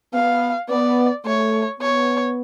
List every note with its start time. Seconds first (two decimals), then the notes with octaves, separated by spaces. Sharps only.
0.14 B3 F5
0.69 B3 D5
1.26 A3 C#5
1.81 B3 C#5